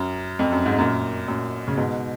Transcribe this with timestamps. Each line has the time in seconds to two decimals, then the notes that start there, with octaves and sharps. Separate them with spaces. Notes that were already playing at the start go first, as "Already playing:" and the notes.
Already playing: F#2
0.39 F2
0.52 F#2
0.66 G#2
0.79 F#2 A#2
1.28 F#2 A#2
1.68 C#3
1.77 G#2 B2